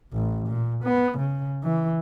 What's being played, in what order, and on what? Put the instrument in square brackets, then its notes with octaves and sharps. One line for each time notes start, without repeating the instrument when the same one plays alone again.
[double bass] A1
A#2
B3
C#3
E3